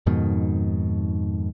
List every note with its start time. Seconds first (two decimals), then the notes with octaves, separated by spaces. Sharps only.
0.06 F2 G#2 B2 D#3